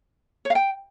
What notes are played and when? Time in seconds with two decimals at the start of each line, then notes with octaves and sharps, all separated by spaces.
0.45 C#5
0.50 F5
0.55 G5